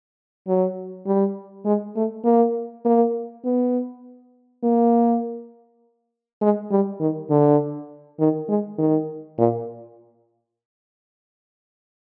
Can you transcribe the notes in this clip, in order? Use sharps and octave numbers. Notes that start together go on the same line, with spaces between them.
F#3
G3
G#3
A3
A#3
A#3
B3
A#3
G#3
G3
D#3
D3
D#3
G#3
D#3
A#2